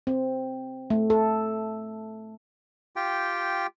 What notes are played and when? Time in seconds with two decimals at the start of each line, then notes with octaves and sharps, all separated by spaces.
0.07 C4
0.90 A3
1.10 A4
2.96 F4 G4 G5